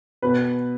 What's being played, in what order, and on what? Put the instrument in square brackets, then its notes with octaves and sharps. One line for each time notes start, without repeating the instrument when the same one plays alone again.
[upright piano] B2 B4